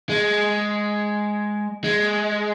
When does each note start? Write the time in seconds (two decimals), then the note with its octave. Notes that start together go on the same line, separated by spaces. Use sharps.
0.09 G#3
1.84 G#3